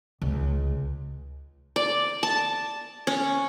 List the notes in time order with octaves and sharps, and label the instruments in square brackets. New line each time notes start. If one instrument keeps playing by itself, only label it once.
[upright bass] C#2
[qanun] D5
A5
C#4